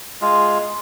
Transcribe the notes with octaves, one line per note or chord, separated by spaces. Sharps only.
G#3 F4